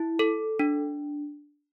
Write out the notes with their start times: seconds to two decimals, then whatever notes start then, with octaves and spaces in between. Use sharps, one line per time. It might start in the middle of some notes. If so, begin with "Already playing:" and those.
Already playing: E4
0.19 A4
0.59 D4